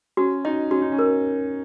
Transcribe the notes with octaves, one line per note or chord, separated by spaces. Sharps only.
C#4 F#4
D#4 D#5
C#4 F#4
D#4
C#4
A#4